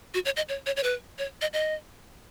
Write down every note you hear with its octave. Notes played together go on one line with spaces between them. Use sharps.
F#4
C#5
D#5
C#5
C#5
C#5
B4
C#5
D#5
D#5